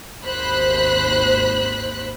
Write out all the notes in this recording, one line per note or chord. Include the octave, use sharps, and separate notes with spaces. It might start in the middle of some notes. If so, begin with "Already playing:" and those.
G#1 D#2 C5 B5 F#6